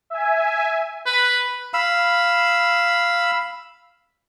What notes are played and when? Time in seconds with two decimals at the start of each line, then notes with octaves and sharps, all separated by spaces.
0.10 E5 G#5
1.06 B4
1.74 F5 B5 E6